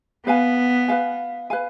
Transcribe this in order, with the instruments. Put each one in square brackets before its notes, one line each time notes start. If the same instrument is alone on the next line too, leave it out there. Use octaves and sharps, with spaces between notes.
[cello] B3 [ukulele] B4 F5 G#5
[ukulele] B4 F5 G#5
B4 F5 G#5